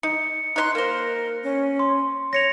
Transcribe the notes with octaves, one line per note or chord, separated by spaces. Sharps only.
D#4 C#7
D#4 C#5 C6 F#6
A#3 A#4 C5
C#4
C6
C#5 A#6 C#7 F7